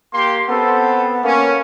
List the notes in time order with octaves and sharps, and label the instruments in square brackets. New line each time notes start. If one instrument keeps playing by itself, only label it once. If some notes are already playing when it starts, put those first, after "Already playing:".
[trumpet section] A#3 G4 C6
[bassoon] B3 [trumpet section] C4 A4
[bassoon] A#3 [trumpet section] C#4